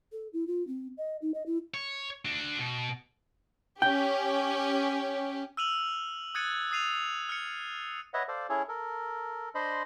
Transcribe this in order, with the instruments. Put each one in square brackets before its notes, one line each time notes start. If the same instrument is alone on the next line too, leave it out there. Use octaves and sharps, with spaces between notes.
[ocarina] A4
E4
F4
C4
D#5
D#4
D#5
E4
[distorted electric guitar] C#5
D4 F#4
B2
[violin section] C#4 G4 [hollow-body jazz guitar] G5
[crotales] E6 F6 D#7 F7 F#7
D#6 F#6 G#6 A6 C#7 D#7
D#6 A6 C7 D#7 F7
F6 C#7
[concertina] B4 C#5 D#5 E5 F#5
A4 C5 D5 F5
C#4 E4 G#4 A4 C#5
A4 A#4
D4 C5 D#5 B5 C6